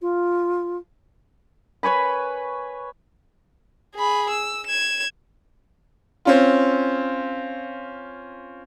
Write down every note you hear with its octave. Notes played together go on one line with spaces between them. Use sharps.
F4
B4 C#5 G#5 B5
G#4 B5
E6
G#6 E7
C4 C#4 F4